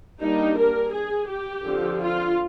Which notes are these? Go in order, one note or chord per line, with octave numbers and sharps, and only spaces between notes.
G3 A#3 D4 D#4
A#4
G#4
G4
D3 F3 C4
F4